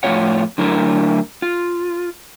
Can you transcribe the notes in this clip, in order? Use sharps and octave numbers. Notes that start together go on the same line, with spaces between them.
F2 A2 B3 F4 C#5 F#5
D3 F#3 A3 E4 A#4
F4